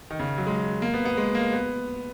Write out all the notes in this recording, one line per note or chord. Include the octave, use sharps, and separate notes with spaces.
D#3
C#3
F#3
G#3
A#3
B3
B3
G#3
A#3
B3